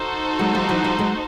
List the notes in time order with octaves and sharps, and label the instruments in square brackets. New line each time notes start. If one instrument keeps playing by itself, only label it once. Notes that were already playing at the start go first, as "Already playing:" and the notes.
Already playing: [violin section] D#4 F#4 A4 C5
[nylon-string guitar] F#3 G#3
F3 G3
E3 F#3
F3 G3
F#3 G#3